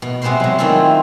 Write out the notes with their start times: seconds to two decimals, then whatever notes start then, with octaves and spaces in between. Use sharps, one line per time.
0.02 B2
0.22 C3 G#3 B3 B4 C5 C6
0.40 F#3 G#3
0.59 D#3 A3 C4 D4 E4 F4